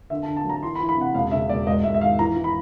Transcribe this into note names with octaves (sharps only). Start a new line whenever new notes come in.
D3 E5
A5
D3
A5
F#3 A#5
E3 C6
B5
E3
B5
C3 F#5
E1 F5
C#3 E5
E1 D5
G#2 D#5
G#2 E5
E5
D#3 F5
E3 A#5
E3
B5